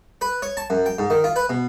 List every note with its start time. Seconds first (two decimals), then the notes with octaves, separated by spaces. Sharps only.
0.21 B4
0.42 C#5
0.57 A5
0.70 F#2
0.86 G5
0.99 G#2
1.10 D#3
1.24 F4
1.36 B4
1.49 B2